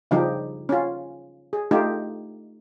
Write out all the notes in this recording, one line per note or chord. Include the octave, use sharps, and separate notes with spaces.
C#3 F3 G3 D#4 G4
C#4 F4
G#4
A3 D#4 F4 G4